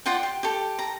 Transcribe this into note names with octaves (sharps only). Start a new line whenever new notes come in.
F4 D5 F#5 G5
G4
G4 A4
A#5